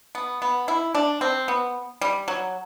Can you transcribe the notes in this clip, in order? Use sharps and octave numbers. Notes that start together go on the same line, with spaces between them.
B3
B3
E4
D4
C4
B3
G3
F#3